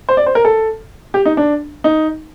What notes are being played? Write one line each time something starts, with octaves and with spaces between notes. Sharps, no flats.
C5
D5
C5
A#4
A4
G4
D#4
D4
D#4